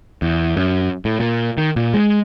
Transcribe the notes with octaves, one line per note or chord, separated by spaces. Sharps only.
E2
F#2
A2
A#2
D#3
A#2
G#3